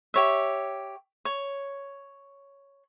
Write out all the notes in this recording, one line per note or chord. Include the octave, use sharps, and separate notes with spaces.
G4 C#5 E5
C#5